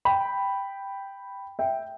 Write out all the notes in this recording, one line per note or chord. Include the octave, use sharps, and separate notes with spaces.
G5 B5
E5 G5